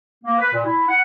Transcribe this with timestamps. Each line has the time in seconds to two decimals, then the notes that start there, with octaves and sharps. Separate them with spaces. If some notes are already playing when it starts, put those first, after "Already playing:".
0.24 A#3
0.39 B4
0.53 A#2
0.65 E4
0.88 F#5